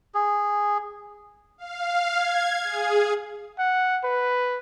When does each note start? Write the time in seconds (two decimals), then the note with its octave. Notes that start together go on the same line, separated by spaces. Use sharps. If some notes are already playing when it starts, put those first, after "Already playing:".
0.14 G#4
1.58 F5
2.17 G#6
2.64 G#4
3.59 F#5
4.04 B4